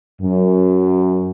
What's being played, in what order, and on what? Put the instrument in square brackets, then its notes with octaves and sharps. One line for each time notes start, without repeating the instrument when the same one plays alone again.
[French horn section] F#2